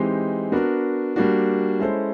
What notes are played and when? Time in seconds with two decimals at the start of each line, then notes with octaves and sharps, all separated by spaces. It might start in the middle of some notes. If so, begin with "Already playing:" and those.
Already playing: E3 G#3 C4 D#4 G4
0.52 B3 D4 F#4 A#4
1.16 G3 A#3 D4 F#4
1.79 G#3 C#4 E4 A4 C5